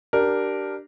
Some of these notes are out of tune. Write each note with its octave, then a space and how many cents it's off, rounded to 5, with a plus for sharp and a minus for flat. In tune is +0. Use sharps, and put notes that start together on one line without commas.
D4 +5 G4 -15 A#4 +0